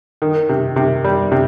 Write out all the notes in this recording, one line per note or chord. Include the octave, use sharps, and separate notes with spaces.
D#3
C3
C3
G3
C3